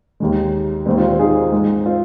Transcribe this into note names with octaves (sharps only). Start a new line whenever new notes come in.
D#2 D#3 G#3
D#2 D#3 G#3 C4
C4 F4
C4 F4
D#4 G#4
G#2 G#3
C4 F4